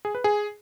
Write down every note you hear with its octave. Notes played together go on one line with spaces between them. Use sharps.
G#4
B4
G#4